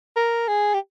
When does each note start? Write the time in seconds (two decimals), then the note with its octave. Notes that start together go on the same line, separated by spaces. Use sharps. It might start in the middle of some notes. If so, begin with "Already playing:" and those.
0.16 A#4
0.48 G#4
0.74 G4